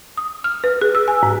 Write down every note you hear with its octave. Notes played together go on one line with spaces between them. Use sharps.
D#6
F6
B4
G#4
E6
G#5
G#2